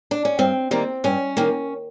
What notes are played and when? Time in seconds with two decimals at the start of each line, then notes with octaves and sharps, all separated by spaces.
0.11 D4
0.25 C#4
0.39 G2 C4
0.71 D#3 G3 A#3 C4
1.04 G2 C#4
1.37 D#3 G3 A#3